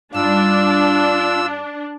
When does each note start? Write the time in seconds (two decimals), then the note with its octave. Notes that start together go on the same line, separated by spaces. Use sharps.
0.14 G2 D4 D#4 F4 E6